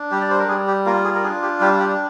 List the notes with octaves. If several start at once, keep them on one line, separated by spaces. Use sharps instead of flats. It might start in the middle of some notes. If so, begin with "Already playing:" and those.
Already playing: D4
G3 G4
D5
C5
A#4
G3 G#4
G4
A#3 F4 A#4
G#4
A#4
D4 G#4
G4
G3 G4
G4